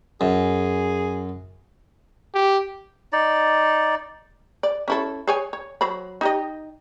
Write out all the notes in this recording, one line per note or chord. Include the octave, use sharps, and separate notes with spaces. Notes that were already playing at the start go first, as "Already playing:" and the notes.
F#2 G#4
G4
D#4 D5
D5
C#4 E4 A4
G#4 C#5 G#5
C#5
F#3 C5 B5
D#4 G4 D#5